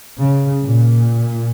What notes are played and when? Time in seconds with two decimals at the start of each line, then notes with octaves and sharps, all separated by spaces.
0.20 C#3
0.63 A#2